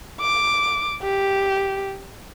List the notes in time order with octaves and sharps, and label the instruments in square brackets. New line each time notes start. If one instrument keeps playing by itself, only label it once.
[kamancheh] D6
G4